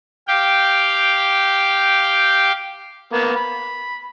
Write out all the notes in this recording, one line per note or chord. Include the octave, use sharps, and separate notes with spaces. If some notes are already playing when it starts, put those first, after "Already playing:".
G4 F5 G5
A#3 B3
B5